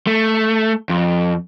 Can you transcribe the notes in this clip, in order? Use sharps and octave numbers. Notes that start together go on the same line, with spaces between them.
A3
F2